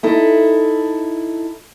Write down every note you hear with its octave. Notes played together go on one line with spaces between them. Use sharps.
D#4 E4 A4